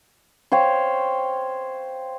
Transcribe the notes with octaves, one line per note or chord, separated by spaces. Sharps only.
C5 C#5 F5 G5